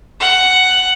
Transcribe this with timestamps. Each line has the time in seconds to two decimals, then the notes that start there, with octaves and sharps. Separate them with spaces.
0.20 F#5